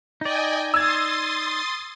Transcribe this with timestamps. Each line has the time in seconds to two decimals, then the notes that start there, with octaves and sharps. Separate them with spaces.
0.21 D#4 D5 D#5 G5 G#5
0.74 C6 D#6 E6 G#6 A6